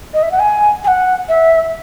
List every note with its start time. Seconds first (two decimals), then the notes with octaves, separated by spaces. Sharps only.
0.14 D#5
0.23 E5
0.31 F#5
0.39 G#5
0.84 G#5
0.87 F#5
1.29 E5